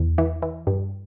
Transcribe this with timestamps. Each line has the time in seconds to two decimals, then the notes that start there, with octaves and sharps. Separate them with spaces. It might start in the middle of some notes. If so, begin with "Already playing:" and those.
Already playing: E2
0.18 E3
0.42 E3
0.67 G2